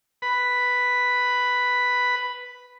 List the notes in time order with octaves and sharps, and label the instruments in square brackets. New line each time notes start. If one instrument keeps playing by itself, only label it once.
[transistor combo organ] B4 B5